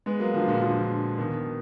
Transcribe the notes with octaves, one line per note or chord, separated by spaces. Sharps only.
G#3 B3
F#3 A#3
D3 F3
A#2 D3
D3 F3
B2 D#3